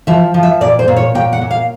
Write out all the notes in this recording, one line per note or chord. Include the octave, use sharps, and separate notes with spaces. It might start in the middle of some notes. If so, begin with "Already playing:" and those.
F3 E5
F3
E5
A#2 D5
C5
A#2
C#5
A#2 G5
F#5
A#2
F5